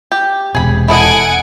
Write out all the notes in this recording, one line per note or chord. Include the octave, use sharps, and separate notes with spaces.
G4
E1 C3 G#4 B5
E4 A4 D#5 F#5 G#5 D7